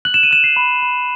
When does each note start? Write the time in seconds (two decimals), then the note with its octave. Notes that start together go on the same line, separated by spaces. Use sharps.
0.05 F#6 F#7
0.14 E7
0.23 D#7
0.31 F#6 E7
0.44 C7
0.56 B5
0.82 B5